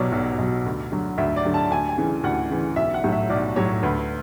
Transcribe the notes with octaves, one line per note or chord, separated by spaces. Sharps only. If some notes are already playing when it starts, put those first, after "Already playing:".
Already playing: B1 B2 F#3 C#5 D5
B1
B2 F#3
D2
D3 F#3
D2 E5
D5
D3 F#3
A5
D2 G#5
G#5
C#3 E3
D2 F#5
C#3 E3
B1 E5
F#5
A2 F#3
E5
B1 D5
A2 F#3 C#5
D2 B4